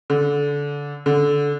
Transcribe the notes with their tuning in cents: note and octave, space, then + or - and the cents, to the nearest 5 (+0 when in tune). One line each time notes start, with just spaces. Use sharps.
D3 -25
D3 -20